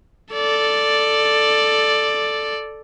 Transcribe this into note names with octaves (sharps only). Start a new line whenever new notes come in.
A4 D5